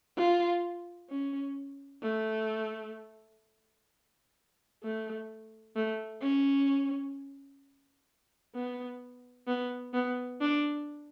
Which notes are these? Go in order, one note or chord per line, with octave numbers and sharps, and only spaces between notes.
F4
C#4
A3
A3
A3
C#4
B3
B3
B3
D4